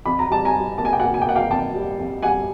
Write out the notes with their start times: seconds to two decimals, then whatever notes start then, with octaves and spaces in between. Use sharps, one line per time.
0.06 F2 B5
0.19 A#5
0.29 G3 A5
0.45 G#5 A#5
0.54 G3
0.78 A#3 A5
0.85 G#5
0.93 G5
1.00 F#5 G#5
1.03 A#3
1.14 G#5
1.22 G5
1.27 A#3 F#5
1.35 F5 G5
1.50 F2 G5 A5
1.74 G3
1.99 F2
2.23 G3 F#5 G#5